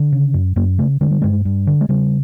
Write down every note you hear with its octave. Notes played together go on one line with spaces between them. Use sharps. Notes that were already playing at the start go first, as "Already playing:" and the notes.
Already playing: D3
C#3
F#2
F#2 A#3
C#3 A3
D3 G#3
G3
G2 G#3
G2
D3
G#3
C#3 G3